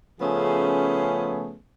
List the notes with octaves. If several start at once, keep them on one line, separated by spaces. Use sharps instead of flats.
C#3 F3 A3 B3 C#4 G#4